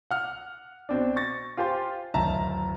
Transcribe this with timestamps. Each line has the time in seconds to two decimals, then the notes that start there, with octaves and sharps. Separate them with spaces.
0.11 F#5 F6
0.89 B2 C4 D4
1.16 C#6 A6 A#6
1.57 F4 G4 C5 G#5 C6
2.14 D1 F#2 D#3 E5 A5 A#5